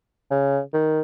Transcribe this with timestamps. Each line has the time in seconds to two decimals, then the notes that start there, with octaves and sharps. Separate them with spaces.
0.31 C#3
0.73 D#3